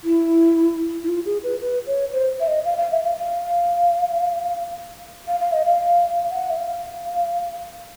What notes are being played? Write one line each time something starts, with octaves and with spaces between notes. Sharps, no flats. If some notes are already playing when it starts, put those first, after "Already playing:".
E4
E4
F4
G#4
B4
B4
C#5
C5
E5
D#5
F5
F5
E5
F5
F5
F5
F5
D#5
F5
F5
F#5
E5
F5